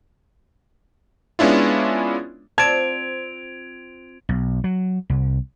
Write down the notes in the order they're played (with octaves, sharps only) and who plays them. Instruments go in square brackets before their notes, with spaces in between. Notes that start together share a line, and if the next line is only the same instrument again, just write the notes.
[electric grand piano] G#3 B3 C#4 D4 E4 F4
[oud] C4 F4 D5 [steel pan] A5 [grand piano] G#6 [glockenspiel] D7 F7
[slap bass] B1
F#3
C2